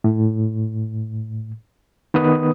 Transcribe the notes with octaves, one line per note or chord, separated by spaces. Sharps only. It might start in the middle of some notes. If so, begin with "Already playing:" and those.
A2
D#3 B3 B4 D#6